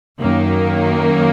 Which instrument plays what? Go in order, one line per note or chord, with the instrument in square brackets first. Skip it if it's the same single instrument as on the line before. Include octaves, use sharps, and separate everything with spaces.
[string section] F#2 D#3 A#3